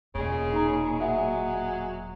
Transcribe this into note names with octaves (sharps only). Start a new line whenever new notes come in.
E1 A#2 C#3 G#3
D#4 A#5
F#3 E5 F#5